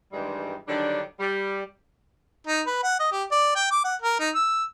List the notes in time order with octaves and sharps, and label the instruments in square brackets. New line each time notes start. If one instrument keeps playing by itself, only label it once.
[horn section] G2 D#3 E3 G3 G#3
D3 D#3 F#3 G3 D4
G3
[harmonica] D#4
B4
F#5
D#5
G4
D5
G5
D6
F#5
A#4
D#4
E6